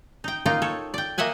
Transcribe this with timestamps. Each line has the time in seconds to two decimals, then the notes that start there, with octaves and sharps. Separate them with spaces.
0.24 D#4 G5
0.46 A#3 D#4 F4 G5
0.62 A4 C#5
0.94 D5 G5
1.18 A#3 D#5 E5 F#5 G#5